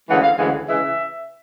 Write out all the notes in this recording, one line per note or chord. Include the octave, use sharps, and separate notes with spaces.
D2 C#3 E3 G#3 F#5
F5
D2 C#3 E3 G#3 F#5
C#3 E3 G#3 E5